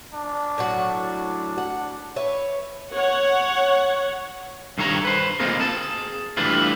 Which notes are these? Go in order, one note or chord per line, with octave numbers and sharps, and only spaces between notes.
D4
A2 F#3 F#4
F#5
B4 C#5 E5
C#5 F#5
G2 D#3 A4 C#5 A#5
B4 C5
A#3 C4 D#4 F4 G#4 A#4
G#4 A5
E3 G3 A3 D4 E4 F4